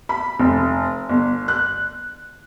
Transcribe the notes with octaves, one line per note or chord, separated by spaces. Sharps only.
B5
F1
G1
F#6